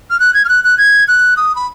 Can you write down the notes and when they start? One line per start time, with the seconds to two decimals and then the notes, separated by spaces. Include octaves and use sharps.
0.10 F6
0.20 F#6
0.34 G#6
0.45 F6
0.49 F#6
0.64 F#6
0.78 G#6
1.08 F#6
1.37 D#6
1.56 B5